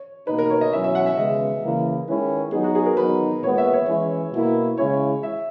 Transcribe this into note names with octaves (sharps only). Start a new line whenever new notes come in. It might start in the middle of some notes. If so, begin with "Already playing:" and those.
Already playing: C#5
B2 A#3 D#4 B4
A#4
C#5
D#5
B2 F#3 C#4 E4 E5
E5
F#5
E5
C#3 G#3 B3 D#5
C#3 E3 A#3 E4
D#3 G#3 C#4 E4 B4
F#3 B3 D#4 G#4
F#4
G#4
A#4
F#3 B3 D#4 B4
A#2 G#3 B3 C#5
E5
C#5
E3 G#3 C#4 E4
B2 A#3 E4
C#3 G#3 C#4 E4 C#5
E5